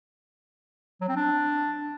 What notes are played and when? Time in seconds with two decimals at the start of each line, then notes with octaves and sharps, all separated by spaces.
1.01 F#3
1.08 C4
1.16 D4